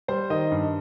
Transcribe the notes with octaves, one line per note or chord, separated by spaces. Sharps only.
G3 C5
D#3 D#5
G2